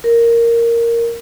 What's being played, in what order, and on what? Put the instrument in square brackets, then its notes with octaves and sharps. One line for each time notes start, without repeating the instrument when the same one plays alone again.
[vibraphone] A#4